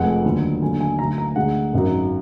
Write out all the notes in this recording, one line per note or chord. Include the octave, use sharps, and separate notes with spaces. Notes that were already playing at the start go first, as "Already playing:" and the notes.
Already playing: F1 F2 F3 G#3 F#5
D#2 D3 F#3
D#2 D3 F#3 G#5
G#5
D2 D3 F#3 A#5
A#5
D2 D3 G#3 F#5
G#1 F#2 D#3 F#3